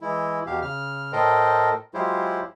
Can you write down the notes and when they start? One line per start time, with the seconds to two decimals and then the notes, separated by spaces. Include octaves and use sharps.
0.01 E3 G#3 E4
0.46 E2 B2 G4 F5
0.62 C#3 F6
1.13 A2 A4 A#4 C5 D#5 G5
1.94 F#3 G#3 E4 F4 G4 C5